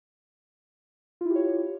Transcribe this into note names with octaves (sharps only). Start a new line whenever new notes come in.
E4 F4 G4 C#5